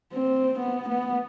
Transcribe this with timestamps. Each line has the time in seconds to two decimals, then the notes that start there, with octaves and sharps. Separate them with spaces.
0.13 C4
0.59 B3
0.88 B3